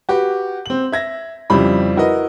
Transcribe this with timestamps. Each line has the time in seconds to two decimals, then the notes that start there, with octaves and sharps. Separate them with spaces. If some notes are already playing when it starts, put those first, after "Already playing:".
0.09 F#4 G4 B4
0.66 C4 F#7
0.92 E5 G#6 A#6
1.50 F2 C#3 G3 E4 B5
1.97 E4 F#4 A#4 B4 D#5